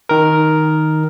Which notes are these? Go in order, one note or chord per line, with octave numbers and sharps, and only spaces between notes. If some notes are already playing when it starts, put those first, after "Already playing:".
D#3 A#4